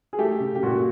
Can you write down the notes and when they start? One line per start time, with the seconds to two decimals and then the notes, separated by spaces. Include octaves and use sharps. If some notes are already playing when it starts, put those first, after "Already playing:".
0.13 G#4
0.19 A3 G4
0.40 C#3
0.55 G4
0.63 A#2 F#4